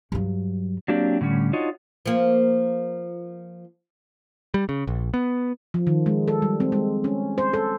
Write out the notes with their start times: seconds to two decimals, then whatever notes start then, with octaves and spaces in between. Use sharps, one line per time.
0.12 G2 F#3
0.88 F#3 A#3 C4 D4 G4 D5
1.21 A2 D3 G3 C#4
1.53 D4 D#4 F4 F#4 C#5 D#5
2.06 F3 A#3
4.54 G3
4.69 C#3
4.87 A#1
5.14 B3
5.74 F3
5.87 D#3
6.06 G#3
6.28 A4
6.42 G3
6.60 C4
6.72 G#3
7.04 C#4
7.38 C5
7.53 A4